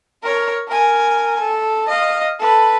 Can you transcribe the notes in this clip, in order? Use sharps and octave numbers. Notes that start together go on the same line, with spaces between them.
A#4 C#5
A#4 G#5
A4
D#5 F5
A4 B4